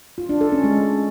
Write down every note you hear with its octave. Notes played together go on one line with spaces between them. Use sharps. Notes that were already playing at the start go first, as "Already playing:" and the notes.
F4
D4
A4
C#4
G#3